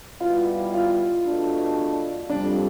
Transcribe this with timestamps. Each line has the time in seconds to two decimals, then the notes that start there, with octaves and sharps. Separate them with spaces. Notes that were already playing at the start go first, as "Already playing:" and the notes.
0.20 B2 G3 B3 E4 F4
0.74 F4
1.26 E2 B2 A3 D4
2.30 F2 C3 G3 D4